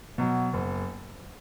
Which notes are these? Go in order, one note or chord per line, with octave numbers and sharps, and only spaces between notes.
B2 F#3
F#1